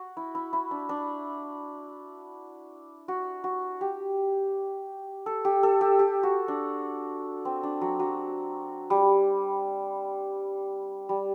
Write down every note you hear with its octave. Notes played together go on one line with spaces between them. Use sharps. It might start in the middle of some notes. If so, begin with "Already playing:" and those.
Already playing: F#4
E4
E4
E4
D4
D4
F#4
F#4
G4
A4
G4
A4
G4
G4
F#4
D4
C4
D4
F#3
F#3
G3
G3